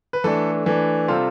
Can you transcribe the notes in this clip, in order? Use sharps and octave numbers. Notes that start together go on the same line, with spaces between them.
B4
E3 A3 D4 A4
E3 A3 D4
C3 G3 C4 F4 A4